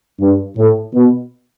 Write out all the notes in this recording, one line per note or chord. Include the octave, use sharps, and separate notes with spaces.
G2
A2
B2